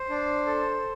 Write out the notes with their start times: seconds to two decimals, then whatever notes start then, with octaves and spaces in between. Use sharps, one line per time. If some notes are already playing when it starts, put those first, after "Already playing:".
Already playing: C5
0.10 D4
0.46 A4